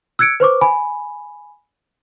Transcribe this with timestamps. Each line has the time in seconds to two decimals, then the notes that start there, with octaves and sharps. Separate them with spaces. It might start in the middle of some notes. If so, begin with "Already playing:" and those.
0.19 E6 F#6 G#6 C#7 D7
0.40 B4 C5 C#6 D6
0.61 G#5 B5